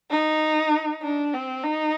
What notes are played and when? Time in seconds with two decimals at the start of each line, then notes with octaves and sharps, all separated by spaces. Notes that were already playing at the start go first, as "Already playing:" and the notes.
0.10 D#4
1.02 D4
1.33 C4
1.64 D#4